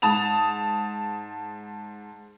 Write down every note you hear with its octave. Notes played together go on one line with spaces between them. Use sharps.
G#2 A5 D#6 F7